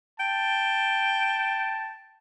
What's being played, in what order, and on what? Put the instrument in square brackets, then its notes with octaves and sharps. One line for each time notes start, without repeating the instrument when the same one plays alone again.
[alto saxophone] G5 [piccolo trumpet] A5